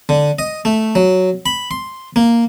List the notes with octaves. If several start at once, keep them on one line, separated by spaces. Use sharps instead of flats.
D3
D#5
A3
F#3
B5
C6
A#3